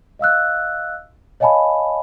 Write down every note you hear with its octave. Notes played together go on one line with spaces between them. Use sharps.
D#5 F5 E6 F#6
C#5 D#5 F5 G#5 A5 B5